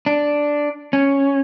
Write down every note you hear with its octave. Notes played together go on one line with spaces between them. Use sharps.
D4
C#4